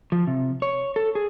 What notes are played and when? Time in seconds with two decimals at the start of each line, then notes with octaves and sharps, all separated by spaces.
0.12 F3
0.27 C3
0.62 C#5
0.96 A4
1.15 G#4